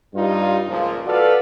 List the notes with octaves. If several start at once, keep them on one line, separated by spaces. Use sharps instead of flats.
G2 G3 D#4 F4
C#2 A#2 F3
F#4 A4 B4 D5 F5